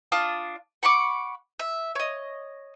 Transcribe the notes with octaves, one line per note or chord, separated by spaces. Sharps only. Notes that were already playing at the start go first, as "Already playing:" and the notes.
D4 F4 D#6
F#5 B5 C#6 D6
E5
C#5 D#5